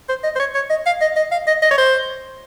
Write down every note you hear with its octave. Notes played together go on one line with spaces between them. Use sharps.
C5
D#5
C5
C#5
C#5
D#5
F5
D#5
D#5
F5
D#5
D#5
C#5
C5